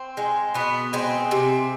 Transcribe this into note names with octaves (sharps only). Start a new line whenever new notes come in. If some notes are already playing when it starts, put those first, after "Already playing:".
Already playing: C4
G#3
B2 B3
G#3 C4
C3